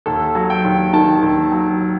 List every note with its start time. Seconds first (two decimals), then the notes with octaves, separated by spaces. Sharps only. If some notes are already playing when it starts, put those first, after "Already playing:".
0.06 D#2 A4
0.35 F#3
0.50 G5
0.64 D#2
0.93 D#3 A5
1.22 D#2
1.52 F#3